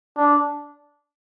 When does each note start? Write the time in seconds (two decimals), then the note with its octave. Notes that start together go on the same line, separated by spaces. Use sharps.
0.17 D4